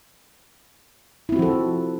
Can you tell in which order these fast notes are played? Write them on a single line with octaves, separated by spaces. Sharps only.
E4 C4 F#4 F3 A4